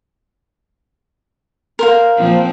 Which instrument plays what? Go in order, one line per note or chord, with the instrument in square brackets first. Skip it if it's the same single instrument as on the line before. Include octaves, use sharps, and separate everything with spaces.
[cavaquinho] A#4 C5 F5
[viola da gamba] A#2 F3 C4